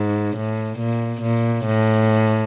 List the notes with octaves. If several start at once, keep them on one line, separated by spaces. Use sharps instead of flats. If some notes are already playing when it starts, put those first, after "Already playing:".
Already playing: G#2
A2
A#2
A#2
A2